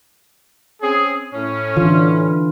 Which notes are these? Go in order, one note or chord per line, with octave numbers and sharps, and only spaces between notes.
C4 C#4 G#4
A2 C#4
D3 E3 F4